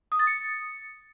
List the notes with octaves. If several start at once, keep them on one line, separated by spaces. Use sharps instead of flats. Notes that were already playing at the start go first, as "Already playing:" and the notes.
D#6
A6
C#7